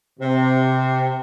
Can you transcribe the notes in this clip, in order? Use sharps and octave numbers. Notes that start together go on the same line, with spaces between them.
C3